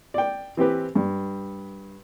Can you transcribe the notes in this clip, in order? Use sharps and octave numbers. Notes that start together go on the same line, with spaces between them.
D5 G5
E3 C4 G4 B4
G2